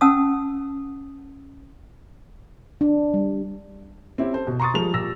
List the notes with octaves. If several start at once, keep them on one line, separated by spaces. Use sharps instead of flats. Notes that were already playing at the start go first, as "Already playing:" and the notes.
C#4 F#5 A5 D#6 E6
D4
G3
C4 C#4 E4 G4
A4 C5
B2
A#5 C6 C#6 D#6 A6
F3 G3 G#3 A#4 F7
A#2 G4 E6 A#6